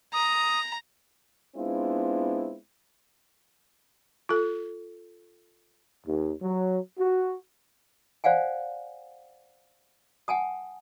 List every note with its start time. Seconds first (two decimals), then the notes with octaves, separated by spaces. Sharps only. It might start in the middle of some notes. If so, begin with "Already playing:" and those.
0.13 A#5 D#6
1.55 G#3 B3 C4 D4 E4 F4
4.29 F4 A4
6.06 D#2
6.41 F#3
6.98 F#4
8.24 C5 D5 F5 F#5 G#5
10.28 F#5 G#5 A5 D#6